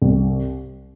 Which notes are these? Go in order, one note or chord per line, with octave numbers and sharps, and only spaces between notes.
C2